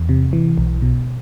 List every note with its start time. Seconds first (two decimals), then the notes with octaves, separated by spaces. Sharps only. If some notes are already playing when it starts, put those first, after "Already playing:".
Already playing: E2
0.09 C3
0.33 E3
0.58 B1
0.82 B2